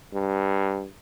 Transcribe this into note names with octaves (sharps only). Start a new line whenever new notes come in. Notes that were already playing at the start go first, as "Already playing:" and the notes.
G2